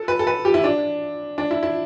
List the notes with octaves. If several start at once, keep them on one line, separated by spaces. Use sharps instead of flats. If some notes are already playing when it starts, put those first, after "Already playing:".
Already playing: A4
B4
A4
B4
G4
E4
D4
D4
E4
E4